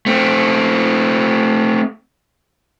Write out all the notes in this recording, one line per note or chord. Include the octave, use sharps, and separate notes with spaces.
A3 C4